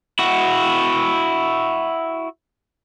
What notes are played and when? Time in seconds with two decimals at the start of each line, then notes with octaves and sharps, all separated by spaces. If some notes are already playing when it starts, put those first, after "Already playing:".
0.19 E4 F#4